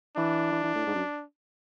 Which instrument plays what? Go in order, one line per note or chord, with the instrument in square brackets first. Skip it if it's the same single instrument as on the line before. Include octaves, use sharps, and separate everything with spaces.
[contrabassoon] E3 [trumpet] D4
[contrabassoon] E3
E3
A2
G#2
F#2